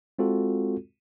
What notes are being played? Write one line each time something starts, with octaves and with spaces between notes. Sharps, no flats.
G#3 C4 F4 F#4 A4